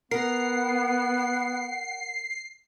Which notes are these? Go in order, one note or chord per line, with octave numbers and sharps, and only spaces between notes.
B3 A#4 F#5 C7